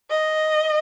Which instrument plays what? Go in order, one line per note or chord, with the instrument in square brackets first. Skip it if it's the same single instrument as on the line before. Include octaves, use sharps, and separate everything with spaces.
[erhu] D#5